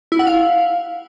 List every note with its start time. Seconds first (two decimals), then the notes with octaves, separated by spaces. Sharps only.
0.12 E4
0.19 F#5
0.27 F5